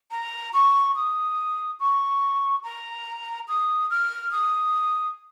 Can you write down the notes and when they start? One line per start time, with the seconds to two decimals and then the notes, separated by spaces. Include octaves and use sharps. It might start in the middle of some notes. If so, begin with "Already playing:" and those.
0.11 A#5
0.54 C#6
0.95 D#6
1.80 C#6
2.64 A#5
3.48 D#6
3.90 F6
4.31 D#6